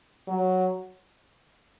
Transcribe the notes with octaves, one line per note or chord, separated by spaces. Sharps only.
F#3